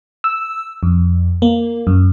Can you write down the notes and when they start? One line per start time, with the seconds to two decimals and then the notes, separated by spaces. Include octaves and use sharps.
0.24 E6
0.83 F2
1.42 A#3
1.87 F#2